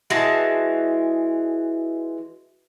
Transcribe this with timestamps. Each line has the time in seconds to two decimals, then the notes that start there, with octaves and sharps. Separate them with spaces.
0.10 E3 G#3 F#4 A5